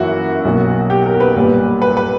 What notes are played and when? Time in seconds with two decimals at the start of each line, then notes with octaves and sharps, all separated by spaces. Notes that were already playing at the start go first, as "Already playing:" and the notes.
Already playing: F#2 E3 A#3 E4 F#4
0.45 B1 B2 F#3 A#3
0.90 G4
1.06 A#4
1.20 B4
1.36 B1 A#2 G3
1.82 B4
1.97 B4